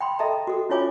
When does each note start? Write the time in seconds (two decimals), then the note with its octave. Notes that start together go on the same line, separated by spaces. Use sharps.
0.01 G5 B5 C6
0.19 A4 D#5 E5 G5 A5 A#5
0.47 F#4 A4
0.69 C#4 E4 F4 C#5 G#5 D6